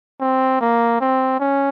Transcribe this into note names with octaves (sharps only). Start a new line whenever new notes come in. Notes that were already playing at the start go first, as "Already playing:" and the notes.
C4
A#3
C4
C#4